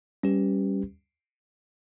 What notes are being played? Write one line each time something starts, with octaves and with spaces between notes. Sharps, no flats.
G3 C#4 G4 B4